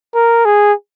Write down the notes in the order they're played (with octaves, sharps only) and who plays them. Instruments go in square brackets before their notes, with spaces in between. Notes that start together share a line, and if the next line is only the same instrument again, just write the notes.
[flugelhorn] A#4
G#4